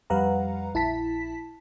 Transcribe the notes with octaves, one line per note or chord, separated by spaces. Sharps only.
F2 G3 B4 F5 F#5 A#5
A#1 E4 A5 B6